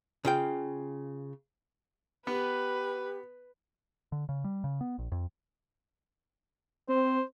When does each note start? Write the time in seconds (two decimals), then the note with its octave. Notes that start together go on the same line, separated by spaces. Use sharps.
0.25 C#3 F4 G5
2.27 B3 G4 B4
4.12 D3
4.29 C#3
4.44 G3
4.64 C#3
4.81 B3
4.98 A#1
5.12 F2
6.89 C4 C5